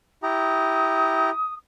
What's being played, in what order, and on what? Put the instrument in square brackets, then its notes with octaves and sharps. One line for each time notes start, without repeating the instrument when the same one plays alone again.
[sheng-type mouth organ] E4 G4 A#5 [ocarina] D#6